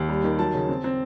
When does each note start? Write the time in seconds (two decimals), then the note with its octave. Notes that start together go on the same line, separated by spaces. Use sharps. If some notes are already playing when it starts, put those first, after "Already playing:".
Already playing: D#2
0.09 G3
0.24 D#3
0.39 F#3 A5
0.54 C#3
0.69 C4
0.84 C4